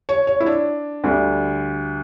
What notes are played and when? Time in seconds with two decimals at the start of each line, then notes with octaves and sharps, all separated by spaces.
0.09 C#5
0.27 C#5
0.40 E4
0.46 D4
1.04 D2 D3 G3